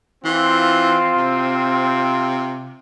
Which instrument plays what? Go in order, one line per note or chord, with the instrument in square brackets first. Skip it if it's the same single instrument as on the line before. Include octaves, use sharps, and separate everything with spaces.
[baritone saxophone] E3 [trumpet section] C4 F4
[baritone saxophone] C3